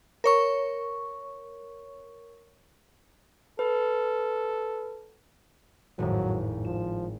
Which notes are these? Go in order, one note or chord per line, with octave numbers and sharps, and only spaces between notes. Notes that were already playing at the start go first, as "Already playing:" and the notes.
A#4 C#5 C#6
A4 B4
G#1 F2 A2 F#3
F3 E7